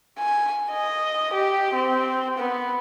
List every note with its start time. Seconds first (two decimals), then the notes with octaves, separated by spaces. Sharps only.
0.18 G#5
0.71 D#5
1.33 G4
1.74 C4
2.38 B3